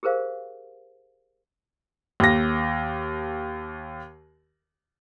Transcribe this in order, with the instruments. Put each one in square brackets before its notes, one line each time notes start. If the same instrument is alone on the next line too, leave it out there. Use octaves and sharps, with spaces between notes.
[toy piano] G4 G#4 A#4 C5 F5
[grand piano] D#2 A#6